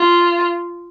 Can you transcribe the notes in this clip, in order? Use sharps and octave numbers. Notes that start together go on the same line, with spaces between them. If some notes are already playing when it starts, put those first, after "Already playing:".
Already playing: F4